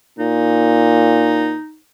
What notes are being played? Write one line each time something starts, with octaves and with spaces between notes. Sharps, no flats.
A#2 D#4